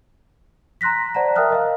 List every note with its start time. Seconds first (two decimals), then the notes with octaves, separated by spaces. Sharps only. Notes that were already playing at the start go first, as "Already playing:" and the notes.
0.81 A#5 C6 F#6 A#6 B6
1.15 C5 D5 F#5 A5 A#5
1.35 A#4 E5 G5 D#6 F6 F#6
1.50 A#4 D#5 F5